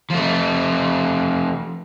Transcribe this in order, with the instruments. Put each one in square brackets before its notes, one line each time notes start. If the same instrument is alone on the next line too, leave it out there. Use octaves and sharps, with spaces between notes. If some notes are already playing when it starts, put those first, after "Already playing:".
[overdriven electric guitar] F3 A3